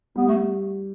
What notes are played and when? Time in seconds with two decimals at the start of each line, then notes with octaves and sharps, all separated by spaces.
0.16 G3 B3
0.27 G3 A3